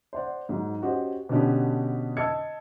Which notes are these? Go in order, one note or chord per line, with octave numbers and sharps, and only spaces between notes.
C5 D5 F#5
G#2 F#3
C#4 F#4 G4 C5 D#5
B2 D3 B3 C#4 D4 G4
D#5 A5 E6 G#6 C#7